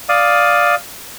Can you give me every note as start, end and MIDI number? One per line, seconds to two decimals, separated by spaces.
0.09 0.75 74
0.09 0.75 77
0.09 0.75 87